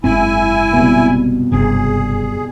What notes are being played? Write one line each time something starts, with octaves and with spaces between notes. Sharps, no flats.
F#1 G#2 C4 E4 G#5
C2 B2
F#1 G2 C3 G#4